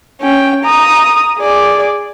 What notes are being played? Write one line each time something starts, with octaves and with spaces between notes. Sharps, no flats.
C#4 G5
A#5 D#6
G#4 D5